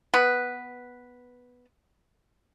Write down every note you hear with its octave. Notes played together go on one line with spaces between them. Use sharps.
B3 B4